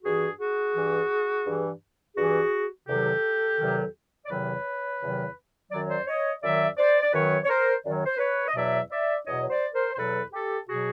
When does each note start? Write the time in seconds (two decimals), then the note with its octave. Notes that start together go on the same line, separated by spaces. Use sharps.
0.03 G2 E3 F#4 G#4
0.39 F#4 G#4
0.75 G2 E3
1.45 G2 E3
2.16 G2 E3 F#4 G#4
2.87 E2 C3 D#3 F#3 G4 A4
3.58 E2 C3 D#3 F#3
4.25 D5
4.29 E2 C3 D#3 F#3 B4 C#5
5.01 E2 C3 D#3 F#3
5.71 F#2 D#3 F#3 D5
5.79 C#5
5.88 C5 D5
6.07 C#5 D#5
6.42 F#2 D#3 F#3 D5 E5
6.77 C5 D5
7.01 D5
7.13 F#2 D#3 F#3 B4 C#5
7.43 C#5
7.48 A#4 C5
7.84 F#2 D#3 F#3 D5
7.95 C#5
8.06 C5
8.17 B4 C#5
8.48 D#5
8.55 E2 B2 F#3 D5 E5
8.90 D5 E5
9.25 E2 B2 F#3 C#5 D#5
9.42 C#5
9.49 C5 D5
9.74 A#4 C5
9.93 C5
9.96 E2 B2 F#3 A4 B4
10.32 G4 A4
10.67 B2 F#3 F#4 G#4